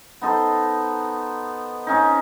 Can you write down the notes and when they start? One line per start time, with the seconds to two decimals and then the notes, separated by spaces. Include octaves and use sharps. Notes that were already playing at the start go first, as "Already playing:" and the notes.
0.22 B3 D#4 A4 C5
1.87 C4 C#4 D#4